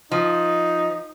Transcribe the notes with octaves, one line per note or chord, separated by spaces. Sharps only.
F3 D#4